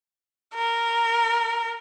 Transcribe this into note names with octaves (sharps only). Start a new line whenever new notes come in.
A#4